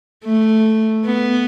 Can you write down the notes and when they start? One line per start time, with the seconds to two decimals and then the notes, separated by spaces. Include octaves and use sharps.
0.25 A3
1.05 B3